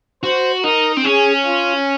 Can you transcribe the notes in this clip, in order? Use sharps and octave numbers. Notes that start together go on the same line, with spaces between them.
F#4 C5
D#4 A#4
C4
C#4 G#4
F4